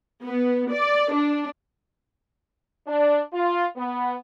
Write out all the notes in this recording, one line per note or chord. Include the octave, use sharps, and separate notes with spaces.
B3
D5
D4
D4
F4
B3